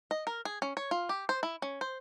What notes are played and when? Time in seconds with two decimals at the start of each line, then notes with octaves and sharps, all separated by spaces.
0.11 D#5
0.27 A#4
0.45 G#4
0.62 C#4
0.77 C#5
0.91 F4
1.09 G4
1.29 C5
1.43 E4
1.62 C#4
1.81 C5